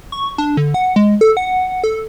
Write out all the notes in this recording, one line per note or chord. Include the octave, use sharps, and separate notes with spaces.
C#6
D4
D3
F#5
G#3
A4
F#5
A4